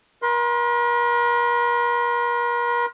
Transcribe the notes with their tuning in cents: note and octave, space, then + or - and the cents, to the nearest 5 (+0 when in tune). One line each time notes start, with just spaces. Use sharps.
A#4 +45 C6 +0